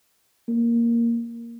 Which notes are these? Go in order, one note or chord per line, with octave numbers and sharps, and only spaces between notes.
A#3